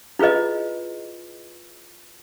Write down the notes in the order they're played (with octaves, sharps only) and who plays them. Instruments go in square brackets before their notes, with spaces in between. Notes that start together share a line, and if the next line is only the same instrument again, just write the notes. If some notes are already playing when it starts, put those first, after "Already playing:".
[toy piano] E4 F4 G#4 B4 D#5